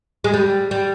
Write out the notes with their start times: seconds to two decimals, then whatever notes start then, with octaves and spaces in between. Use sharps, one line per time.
0.24 G#3
0.34 G3
0.71 G3